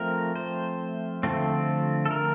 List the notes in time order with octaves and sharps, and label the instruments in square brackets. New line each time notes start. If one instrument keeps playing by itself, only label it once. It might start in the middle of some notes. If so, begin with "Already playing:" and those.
Already playing: [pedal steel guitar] F3 A3 C4 A#4
C5
D3 F3 A3 C4
A4
A#4